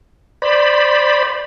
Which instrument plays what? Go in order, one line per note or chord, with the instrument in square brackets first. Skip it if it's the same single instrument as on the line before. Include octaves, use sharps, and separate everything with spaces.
[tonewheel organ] C5 D5 B5